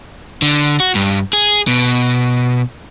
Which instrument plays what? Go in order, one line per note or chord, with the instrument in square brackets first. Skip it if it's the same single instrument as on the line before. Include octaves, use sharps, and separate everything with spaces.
[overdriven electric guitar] D3
F#4
G2
G#4
B2